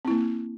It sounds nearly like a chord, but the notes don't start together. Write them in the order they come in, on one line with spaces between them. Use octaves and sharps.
C4 E4 A#3